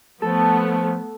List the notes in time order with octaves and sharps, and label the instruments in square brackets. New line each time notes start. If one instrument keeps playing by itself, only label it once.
[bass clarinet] F3 [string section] A3 B3 [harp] A4